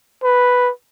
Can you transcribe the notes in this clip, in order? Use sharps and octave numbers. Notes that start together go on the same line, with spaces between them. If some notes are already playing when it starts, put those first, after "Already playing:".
B4